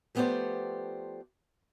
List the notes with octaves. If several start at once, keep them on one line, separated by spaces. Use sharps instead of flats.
F3 A3 B3 G4 C5 D5